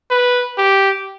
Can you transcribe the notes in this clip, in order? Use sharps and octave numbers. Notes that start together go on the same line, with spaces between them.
B4
G4